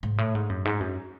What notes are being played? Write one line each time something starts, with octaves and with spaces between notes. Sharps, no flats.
G#2
A2
G#2
F#2
G#2
F#2